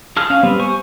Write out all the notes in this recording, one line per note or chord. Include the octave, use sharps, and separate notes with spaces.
G#4 A5 F6
C#4 F5
G3 B3 C4
C5 G#5 C#6